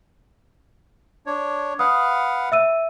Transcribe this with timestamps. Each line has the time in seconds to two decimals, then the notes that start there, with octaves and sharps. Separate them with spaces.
1.26 D4 C#5
1.79 B4 F5 F#5 D#6
2.52 E5 E6 D#7